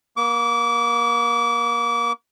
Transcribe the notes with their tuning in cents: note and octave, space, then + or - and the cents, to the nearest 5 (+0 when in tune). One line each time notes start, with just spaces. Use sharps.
A#3 +35 D6 -30